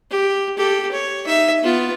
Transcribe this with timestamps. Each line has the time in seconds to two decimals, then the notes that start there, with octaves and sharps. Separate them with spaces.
0.11 G4
0.57 G4 A4
0.92 C#5
1.25 D#4 E5
1.62 B3 F4